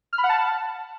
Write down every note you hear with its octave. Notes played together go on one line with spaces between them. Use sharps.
F6
B5
F#5
A5